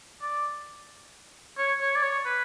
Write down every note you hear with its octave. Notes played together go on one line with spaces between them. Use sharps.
D5
C#5
C#5
D5
C#5
B4